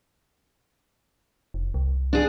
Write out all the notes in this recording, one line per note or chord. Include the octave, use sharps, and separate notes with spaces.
F1
C2
D4 G#4